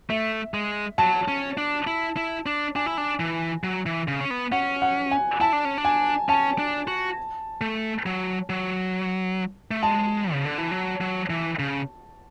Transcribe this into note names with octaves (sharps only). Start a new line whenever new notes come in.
A3 E5
G#3
F#3 A5
C#4
D4
E4
E4
D4
D4 G#5
E4
D4
E3
F#3
E3
C#3
C#4
B3
C#4 F#5
F#5
G#5
E4 A5
D4
C#4
D4
G#5
C#4 A5
D4
F#4
A3
F#3
F#3
A3
G#3 A5
C#3
D3
E3
F#3
F#3
E3
C#3